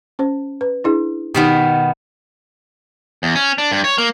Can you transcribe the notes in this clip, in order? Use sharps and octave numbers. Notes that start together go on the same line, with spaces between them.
C#4 C5
B4
D4 E4 G#4
B2 D#3 B3 D#4 G4
E2
C#4
D4
G2
C#5
A#3